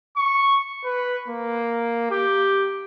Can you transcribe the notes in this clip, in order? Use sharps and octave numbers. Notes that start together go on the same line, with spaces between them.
C#6
B4
A#3
G4